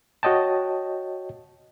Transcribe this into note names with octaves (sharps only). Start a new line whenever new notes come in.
F#4 C#5 D#5 G5 A5